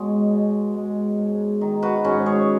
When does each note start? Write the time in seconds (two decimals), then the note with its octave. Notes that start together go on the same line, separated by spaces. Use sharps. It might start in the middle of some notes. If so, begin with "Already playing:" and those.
Already playing: B2 G#3 C#5
0.31 B2
0.74 G#3
1.18 G#2
1.61 D#3
1.83 F#4 B4
2.04 G#2 C#4 F#4
2.26 G#4 C#5